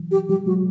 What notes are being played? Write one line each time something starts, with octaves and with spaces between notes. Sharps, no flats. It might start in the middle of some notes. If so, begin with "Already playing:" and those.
Already playing: E3 F#3
G4
F3 G3 G4
F#3 G#3 F#4